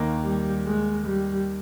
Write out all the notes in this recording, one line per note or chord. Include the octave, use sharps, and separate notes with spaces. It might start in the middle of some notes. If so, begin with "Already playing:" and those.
Already playing: D#2 D#3 A#3
G3
G#3
G3